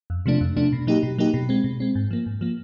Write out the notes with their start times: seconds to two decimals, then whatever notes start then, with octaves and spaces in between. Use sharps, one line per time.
0.10 F2
0.26 C3 F3 A3 D4
0.41 F2
0.56 C3 F3 A3 D4
0.72 B2
0.87 F#3 A#3 D#4 G4
1.03 B2
1.18 F#3 A#3 D#4 G4
1.34 B2
1.49 G#3 C4
1.64 B2
1.80 G#3 C4
1.95 G#2
2.11 F3 A#3
2.26 G#2
2.41 F3 A#3